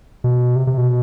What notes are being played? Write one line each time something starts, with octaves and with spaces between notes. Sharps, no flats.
B2
C3
C3
B2